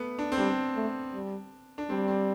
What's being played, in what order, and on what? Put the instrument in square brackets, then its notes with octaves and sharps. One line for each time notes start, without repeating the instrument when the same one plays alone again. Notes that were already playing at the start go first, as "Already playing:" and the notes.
Already playing: [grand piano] A3 B3
D4
C4
[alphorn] G3 [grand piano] D4
[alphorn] A3
G3
[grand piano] D4
[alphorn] G3 [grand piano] C4
[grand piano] C4